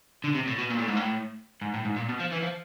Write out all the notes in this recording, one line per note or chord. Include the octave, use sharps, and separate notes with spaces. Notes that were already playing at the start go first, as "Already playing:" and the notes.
D3
C3
A2
B2
A#2
A2
G#2
A2
G#2
A2
G#2
A#2
B2
F3
E3
F3